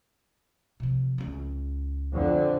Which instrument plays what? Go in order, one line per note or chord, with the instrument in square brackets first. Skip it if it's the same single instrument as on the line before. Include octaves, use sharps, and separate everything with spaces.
[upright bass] C3 F3
C#2 C#4
[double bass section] F2 D3